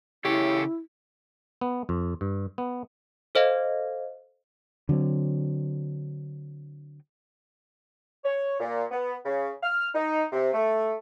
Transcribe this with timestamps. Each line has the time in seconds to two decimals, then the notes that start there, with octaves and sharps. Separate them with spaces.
0.25 C#3 E4 G4 A4 C#5
1.61 B3
1.89 F2
2.21 G2
2.58 B3
3.35 A4 C5 D#5 F5
4.89 D3 F#3 C4
8.24 C#5
8.60 A#2
8.91 B3
9.25 C#3
9.63 F6
9.94 D#4
10.32 C3
10.54 A3